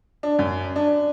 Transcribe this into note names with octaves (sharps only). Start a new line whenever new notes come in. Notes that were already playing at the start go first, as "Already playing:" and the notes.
D4
F#2
D4